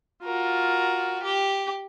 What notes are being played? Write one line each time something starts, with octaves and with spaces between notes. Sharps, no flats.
F4 F#4 A#4
G4